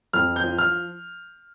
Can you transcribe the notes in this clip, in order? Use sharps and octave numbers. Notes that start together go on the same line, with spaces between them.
F2 F6
G6
F3
F6